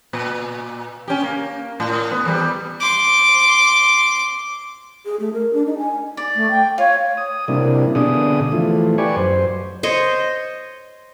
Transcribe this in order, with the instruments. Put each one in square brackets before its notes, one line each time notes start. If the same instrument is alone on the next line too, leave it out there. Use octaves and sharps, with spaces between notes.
[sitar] A#2
C#4 G4
A#3
A2
B3
E2 G3
[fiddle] C6 D6
[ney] G#4
A3
A#4
D4
D#4
G#5
[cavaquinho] D5
[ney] A3
G5
[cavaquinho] F4 [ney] C#5
[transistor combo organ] D#6
C3 G3 A#3 D4 E4
B2 D3 D4 G#4 D#6
E3 F3 A3
G4 B4 D5 G#5 C#6
F#2 C5
[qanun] C5 C#5 D#5